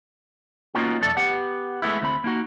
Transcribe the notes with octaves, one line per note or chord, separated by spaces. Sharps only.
A#3 B3 C#4 D#4 F4 F#4
B1 F2 A3 A4 D5
B3 G4 F#5
G#3 A3 B3 E4
D2 C4 B5
A#3 D#4 F#4